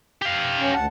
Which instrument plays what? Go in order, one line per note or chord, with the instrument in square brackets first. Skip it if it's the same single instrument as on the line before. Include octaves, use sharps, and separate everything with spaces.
[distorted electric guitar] G4 F5
[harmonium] C#4
D2 F#5 A5